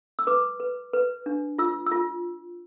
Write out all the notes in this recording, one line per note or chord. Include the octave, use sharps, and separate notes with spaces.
E6
B4 D6
B4
B4
D4
F4 E6
F4 E6